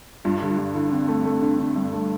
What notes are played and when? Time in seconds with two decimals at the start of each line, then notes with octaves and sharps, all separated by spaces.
0.24 G2 F4
0.42 D3 G4
0.51 F4
0.58 G2 G4
0.75 D3 E4
0.92 D3 C4
1.08 A3
1.25 A3
1.42 D3
1.59 D3
1.76 G2
1.93 A3